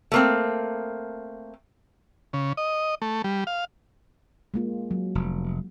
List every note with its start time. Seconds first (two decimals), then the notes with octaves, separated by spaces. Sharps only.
0.12 A3 A#3 C4
2.33 C#3
2.57 D#5
3.02 A3
3.24 G3
3.47 F5
4.54 G#3 A#3 F4
4.91 F#3
5.15 F1